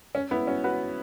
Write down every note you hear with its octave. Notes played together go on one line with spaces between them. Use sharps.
C#4
B3 E4
C#4 F#4
F#4 B4